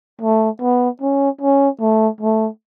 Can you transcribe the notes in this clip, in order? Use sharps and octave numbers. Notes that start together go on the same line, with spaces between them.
A3
B3
C#4
C#4
A3
A3